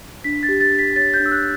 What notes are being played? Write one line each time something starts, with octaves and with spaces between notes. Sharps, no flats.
D4 B6
A6
G4
A6
D4
B6
C#5 A6
G6
D4
E6
F#6